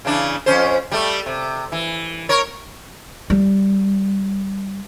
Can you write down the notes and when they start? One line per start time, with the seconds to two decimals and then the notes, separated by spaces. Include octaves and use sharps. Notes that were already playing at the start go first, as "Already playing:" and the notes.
0.05 C#3 E3 D4
0.46 F2 C#4 C5
0.92 G3 A3
1.26 C3
1.72 E3
2.29 A#4 C#5
3.30 G3